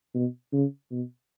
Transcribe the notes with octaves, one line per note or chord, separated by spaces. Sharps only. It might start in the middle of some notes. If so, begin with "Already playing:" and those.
B2
C#3
B2